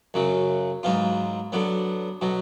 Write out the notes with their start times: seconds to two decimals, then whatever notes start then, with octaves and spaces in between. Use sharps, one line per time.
0.14 F#2 C#3 F#3
0.83 G#2 F#3 B3 F4
1.52 D3 F#3 B3
2.21 B2 F#3